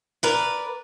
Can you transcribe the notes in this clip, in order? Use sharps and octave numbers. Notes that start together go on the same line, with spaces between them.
A#4 B4 D5